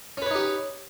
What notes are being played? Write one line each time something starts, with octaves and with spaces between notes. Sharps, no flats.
C#4 D#4 G4 B4 C#5